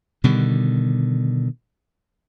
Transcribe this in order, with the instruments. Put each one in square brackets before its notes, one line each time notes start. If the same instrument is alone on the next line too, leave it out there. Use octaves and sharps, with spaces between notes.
[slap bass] B2 D3 D#3 G3